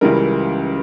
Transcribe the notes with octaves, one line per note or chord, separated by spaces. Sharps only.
C#2 C#3 E3 G3 A#4